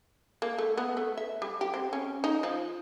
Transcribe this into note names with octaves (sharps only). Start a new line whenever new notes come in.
A#3
A3
B3
A3
E5
G3
G4
C4
C#4
D#4
F3